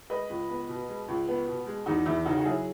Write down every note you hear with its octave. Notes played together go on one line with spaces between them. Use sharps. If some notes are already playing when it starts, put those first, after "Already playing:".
G#3 B4 D#5
C#2
B3
B2
G#3
C#2
B3
B2
G#3
E2 D#4 F#4
E2 E4
C#3 D#4 F#4
F#4
F#3 E4 G#4